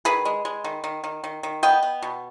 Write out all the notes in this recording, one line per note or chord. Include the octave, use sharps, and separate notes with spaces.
D#3 G#4 B4
G#3
G#3
D#3
D#3
D#3
D#3
D#3
B3 D#5 G5
B3
B2